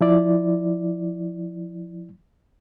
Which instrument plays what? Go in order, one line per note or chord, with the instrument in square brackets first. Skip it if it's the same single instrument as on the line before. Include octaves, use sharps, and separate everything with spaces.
[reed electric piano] F3 E4 D5